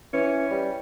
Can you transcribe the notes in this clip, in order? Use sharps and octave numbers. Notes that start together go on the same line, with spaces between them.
E3 C#4
G3